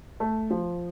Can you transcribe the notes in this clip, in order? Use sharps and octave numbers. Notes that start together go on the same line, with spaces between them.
A3
F3